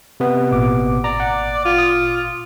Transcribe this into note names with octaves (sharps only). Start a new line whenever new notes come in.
C3 B3
G#1 A#2 D6
D5 A#5
F#5
F4
D#6